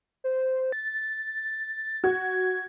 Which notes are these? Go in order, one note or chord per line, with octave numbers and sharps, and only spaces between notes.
C5
A6
F#4 G#6